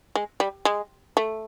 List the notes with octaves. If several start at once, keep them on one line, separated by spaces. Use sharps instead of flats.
G#3
G3
G#3
A3